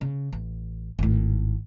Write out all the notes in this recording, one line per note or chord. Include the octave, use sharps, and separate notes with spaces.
C#3
A1
G#1 A2